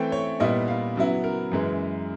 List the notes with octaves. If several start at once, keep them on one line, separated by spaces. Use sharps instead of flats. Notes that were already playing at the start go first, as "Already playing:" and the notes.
Already playing: E3 A3 C4 G5
C#5
A#2 G3 B3 E4 D#5
F5
C#3 F#3 B3 E4
A#4
F#2 C#3 E3 G#3